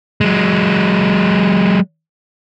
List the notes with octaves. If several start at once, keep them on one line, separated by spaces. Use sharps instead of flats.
F#3 G#3